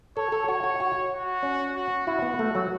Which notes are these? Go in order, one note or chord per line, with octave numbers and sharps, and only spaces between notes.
A4 C#5
A4
F#4 C#5
F#4
F#4
F#4
C#4
F#4
E4 F#4
B3
A3
F#3